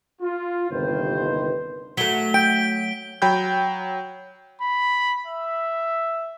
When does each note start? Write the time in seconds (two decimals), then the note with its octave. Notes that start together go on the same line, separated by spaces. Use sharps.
0.21 F4
0.70 G1 D#2 C3 D#3 B4 C5
1.97 F#3 A3 B6 G7
2.34 G5 D7
3.22 F#3 G5 B5 G6
4.61 B5
5.27 E5